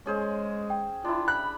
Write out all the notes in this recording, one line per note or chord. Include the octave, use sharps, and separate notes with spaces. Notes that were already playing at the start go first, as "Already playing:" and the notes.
G#3 C#4 G#4 C5
G5
D4 E4 F4
B5 F#6